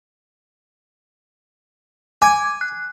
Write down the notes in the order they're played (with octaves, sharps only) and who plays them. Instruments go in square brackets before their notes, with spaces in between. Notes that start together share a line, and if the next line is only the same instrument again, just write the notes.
[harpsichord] G#5 [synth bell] D6 G#6
[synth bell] F#6